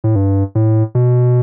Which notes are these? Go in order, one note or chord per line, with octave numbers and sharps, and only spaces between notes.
A2
G2
A2
B2